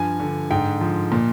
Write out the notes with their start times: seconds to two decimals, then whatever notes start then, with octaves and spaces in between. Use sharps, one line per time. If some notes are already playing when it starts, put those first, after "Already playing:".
Already playing: G2 F3 G#5
0.20 D3
0.51 G#2 G5
0.81 F3
1.12 A#2